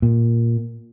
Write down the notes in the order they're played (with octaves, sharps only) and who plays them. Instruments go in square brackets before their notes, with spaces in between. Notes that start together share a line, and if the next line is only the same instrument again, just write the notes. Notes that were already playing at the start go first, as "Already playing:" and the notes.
[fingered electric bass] A#2